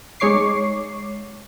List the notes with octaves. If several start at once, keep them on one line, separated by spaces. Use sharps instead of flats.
G#3 D#4 C#5 C#6 D6 C7